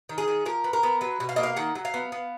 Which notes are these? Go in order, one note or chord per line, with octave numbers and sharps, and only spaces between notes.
D#3
G#4
D#3
F3 A#4
B3
A#4
B3
F#3 B4
B2
F5
A#3 D#5
F5
D#3 F#5
F#3
F5
B3
B3